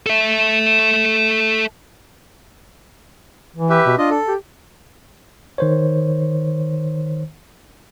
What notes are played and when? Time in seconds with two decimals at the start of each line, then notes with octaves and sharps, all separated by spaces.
0.06 A4 E5
3.56 E3
3.70 G4 B4 E5
3.86 B2
3.98 D4 F4 D#5
4.10 A4
4.28 G4
5.58 D#3 C5 C#5